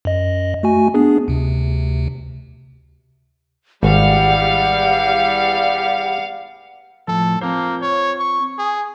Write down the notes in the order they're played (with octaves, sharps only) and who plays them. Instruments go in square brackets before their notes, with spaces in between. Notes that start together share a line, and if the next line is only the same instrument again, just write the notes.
[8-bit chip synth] F#2 D#5
A3 F#4 G#5
B3 D4 G#4
D2 C3
[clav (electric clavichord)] G#1 [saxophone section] E2 E3 G3 [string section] F5 [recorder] F#5
[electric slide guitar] A2 F3 [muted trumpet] A4
[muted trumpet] A#3 [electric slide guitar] C4 F4 C5
[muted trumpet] C#5
C#6
G#4